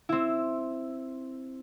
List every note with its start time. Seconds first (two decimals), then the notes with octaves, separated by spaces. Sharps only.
0.09 C4 E4